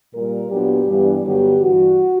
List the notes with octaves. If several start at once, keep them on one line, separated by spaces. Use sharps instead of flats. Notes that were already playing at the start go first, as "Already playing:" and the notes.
A#2 G3 A#3 A#4
A#2 F#3 B3 D4 G4
G2 E3 G3 B3 D4
G2 D3 F#3 B3 G4
G2 E3 G3 F#4